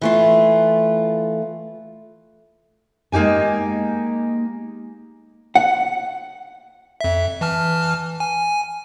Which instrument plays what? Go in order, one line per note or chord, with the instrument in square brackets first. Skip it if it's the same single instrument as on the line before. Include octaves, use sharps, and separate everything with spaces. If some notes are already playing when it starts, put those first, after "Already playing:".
[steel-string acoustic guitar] E3 A3 F4
G#3 A#3 D#4 G4 G#5
[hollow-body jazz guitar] F#5
[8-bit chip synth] F2 E5
E3 A5 F6
G#5